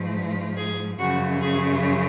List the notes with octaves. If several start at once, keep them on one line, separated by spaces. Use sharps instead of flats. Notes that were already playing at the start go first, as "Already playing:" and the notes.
Already playing: G#2 F3
G#4
F#2 C#3 F3 F#4
G#4